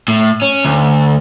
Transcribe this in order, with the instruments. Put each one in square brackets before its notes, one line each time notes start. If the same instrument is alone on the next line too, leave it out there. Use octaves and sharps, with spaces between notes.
[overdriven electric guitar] A2
C#4
D2